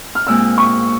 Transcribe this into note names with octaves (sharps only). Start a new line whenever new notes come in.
F6
A#2 G#3 C4 E6
C#6